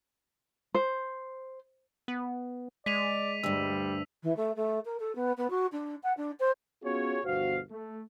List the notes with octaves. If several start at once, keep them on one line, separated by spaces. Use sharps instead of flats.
C5
B3
G#3 D5 B6 D#7 F7
D2 G2 G3 E6
E3
A3
A3
A#4
A4
B3
B3
F#4
D4
F#5
D4
C5
B3 C#4 F4 F#4 G#4 C#5
G1 D2 B2 F#4 C5 F5
A3